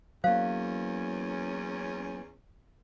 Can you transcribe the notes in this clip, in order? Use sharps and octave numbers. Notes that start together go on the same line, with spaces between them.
E2 F#3 A#3 C#4 C5 F5